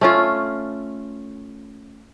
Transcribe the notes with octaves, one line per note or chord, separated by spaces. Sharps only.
A3 C#4 F4